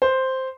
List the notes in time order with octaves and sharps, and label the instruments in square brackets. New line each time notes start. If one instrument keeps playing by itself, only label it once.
[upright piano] C5